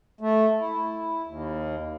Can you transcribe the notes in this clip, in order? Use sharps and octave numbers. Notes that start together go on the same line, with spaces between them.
A3
E4
D#2